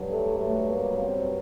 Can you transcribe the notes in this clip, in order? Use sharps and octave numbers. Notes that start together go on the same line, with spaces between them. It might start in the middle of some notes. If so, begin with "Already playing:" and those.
Already playing: G2 F#3
A3
A3
A#3
C4